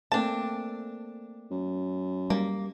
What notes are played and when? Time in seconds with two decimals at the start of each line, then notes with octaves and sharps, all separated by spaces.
0.12 A3 A#3 C4 D4 A5
1.51 F#2
2.30 G3 A#3